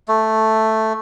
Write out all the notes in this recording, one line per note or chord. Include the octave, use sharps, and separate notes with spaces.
A3